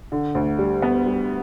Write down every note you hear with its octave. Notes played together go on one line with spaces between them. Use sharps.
D3
D2
G3
B3
G3